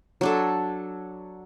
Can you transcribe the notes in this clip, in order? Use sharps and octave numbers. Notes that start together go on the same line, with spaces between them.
F#3 D4 A4